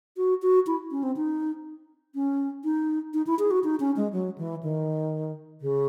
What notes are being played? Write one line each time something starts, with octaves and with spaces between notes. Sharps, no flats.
F#4
F#4
E4
C#4
C4
D#4
C#4
D#4
D#4
E4
G#4
F#4
D#4
C#4
G#3
F#3
E3
D#3
C#3